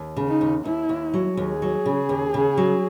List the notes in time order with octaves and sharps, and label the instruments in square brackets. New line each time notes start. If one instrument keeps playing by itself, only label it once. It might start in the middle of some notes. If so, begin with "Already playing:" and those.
Already playing: [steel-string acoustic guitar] D#2
C#3
[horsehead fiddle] D#4
[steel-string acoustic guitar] D#2
[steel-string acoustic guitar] D#2 [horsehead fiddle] E4
[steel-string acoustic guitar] D#2
F#3
[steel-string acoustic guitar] D#2 [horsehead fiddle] G#4
[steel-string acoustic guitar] F#3
C#3
D#2
C#3
F#3